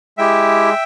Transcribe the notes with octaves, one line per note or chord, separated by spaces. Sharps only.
G#3 E4 G4 E5 G5